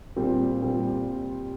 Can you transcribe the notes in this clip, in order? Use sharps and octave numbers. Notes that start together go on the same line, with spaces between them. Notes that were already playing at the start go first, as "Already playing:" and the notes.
A#2 G3 C4
A#2 G3